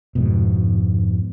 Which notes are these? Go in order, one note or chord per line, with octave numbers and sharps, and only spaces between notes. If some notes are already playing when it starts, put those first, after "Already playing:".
F2 G#2 B2